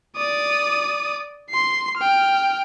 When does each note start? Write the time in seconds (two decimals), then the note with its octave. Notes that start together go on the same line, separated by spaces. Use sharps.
0.16 D5 D#6
1.51 C6 C7
1.97 G5 F6